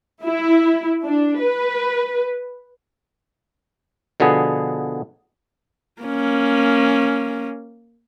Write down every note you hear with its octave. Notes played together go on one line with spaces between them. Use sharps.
E4
D4
B4
B2 D3 F3 B3 G#4
A#3 C#4